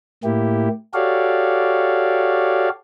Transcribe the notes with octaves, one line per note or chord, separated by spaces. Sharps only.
A2 A#3 E4 G4
F#4 G4 A4 C#5 D5 F5